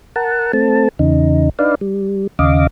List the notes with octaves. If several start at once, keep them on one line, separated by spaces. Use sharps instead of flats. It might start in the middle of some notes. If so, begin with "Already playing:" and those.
A#4 F#5 A5
A3 C4 A5
E2 C#3 D#4
D4 D#4 B4 D5 F5
G3
D#2 C#3 D#5 F5 D6